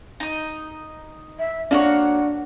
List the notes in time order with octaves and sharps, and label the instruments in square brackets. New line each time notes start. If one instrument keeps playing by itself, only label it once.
[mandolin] D#4 D#5
[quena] E5
[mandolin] A#3 F#4 C#5 [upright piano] D4 [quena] F#5